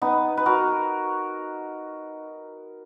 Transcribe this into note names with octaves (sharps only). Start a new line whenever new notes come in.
B3 D#4
B4
F#4 A#4